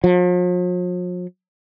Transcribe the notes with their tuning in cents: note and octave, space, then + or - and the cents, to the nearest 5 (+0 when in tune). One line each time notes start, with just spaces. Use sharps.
F3 +45